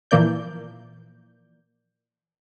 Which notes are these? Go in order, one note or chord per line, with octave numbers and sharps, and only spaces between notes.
A#2 E3 F3 A#3 D5 G6